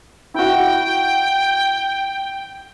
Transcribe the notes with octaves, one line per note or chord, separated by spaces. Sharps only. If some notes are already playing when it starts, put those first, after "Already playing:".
E4 F#4 G5